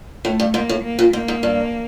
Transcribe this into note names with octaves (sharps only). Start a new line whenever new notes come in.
A2 A3
G2
G#2 A#3
A2
A#3
A#2
G#2 A#3
G#2
G2